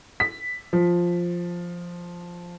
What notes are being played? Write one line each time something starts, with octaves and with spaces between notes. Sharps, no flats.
B6
F3